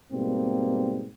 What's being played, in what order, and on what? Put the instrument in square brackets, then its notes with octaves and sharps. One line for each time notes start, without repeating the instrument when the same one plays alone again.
[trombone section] G#2 B2 G3 A#3 C4